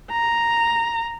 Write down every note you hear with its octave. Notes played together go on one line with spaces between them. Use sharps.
A#5